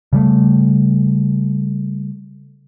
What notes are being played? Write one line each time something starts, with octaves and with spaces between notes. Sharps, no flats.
C#3 G3 A3